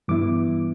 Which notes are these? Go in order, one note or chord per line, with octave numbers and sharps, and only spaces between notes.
G2 E3 B3 E4 D6